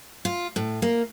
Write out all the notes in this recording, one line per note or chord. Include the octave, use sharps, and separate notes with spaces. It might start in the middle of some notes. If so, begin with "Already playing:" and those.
F4
A2
A#3